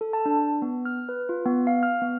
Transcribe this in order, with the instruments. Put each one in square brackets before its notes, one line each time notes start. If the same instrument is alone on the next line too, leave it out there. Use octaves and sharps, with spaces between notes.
[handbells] A4
A5
D4
B3
F6
B4
F4
B3
F5
F6
B3